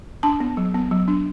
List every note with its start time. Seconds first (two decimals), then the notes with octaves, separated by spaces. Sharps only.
0.23 D4 A5
0.40 B3
0.57 F#3
0.75 B3
0.91 F#3
1.08 D4